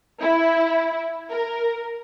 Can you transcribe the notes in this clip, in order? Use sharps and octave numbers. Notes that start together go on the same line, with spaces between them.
E4
A#4